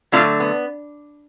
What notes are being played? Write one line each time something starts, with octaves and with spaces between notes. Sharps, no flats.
D3 F#3 A3 F4
B3